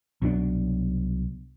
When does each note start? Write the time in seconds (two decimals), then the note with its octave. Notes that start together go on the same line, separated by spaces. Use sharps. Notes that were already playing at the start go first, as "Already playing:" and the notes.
0.22 C2 B2 F#3 D4